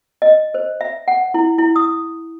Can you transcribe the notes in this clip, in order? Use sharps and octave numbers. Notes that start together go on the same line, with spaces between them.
D#5
C5
E5
F#5
E4
E4
D#6